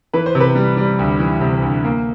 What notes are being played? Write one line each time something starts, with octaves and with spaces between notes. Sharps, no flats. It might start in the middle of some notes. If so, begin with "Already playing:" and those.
E3 B4
C5
C3
B4
G3
G3
D2
E3
C3
D2
A#3